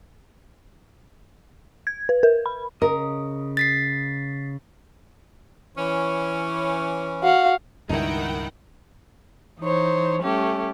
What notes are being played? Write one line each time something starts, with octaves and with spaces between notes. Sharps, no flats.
G#6
B4
A#4
B5
C#3 A#4 D#5 D#6
A6 B6 C7
E3 C#4
F#4 F5
C#2 G2 D#3 D#4 E4 F#5 G5
E3 D#4 C5 C#5
G3 A3 C#4 G4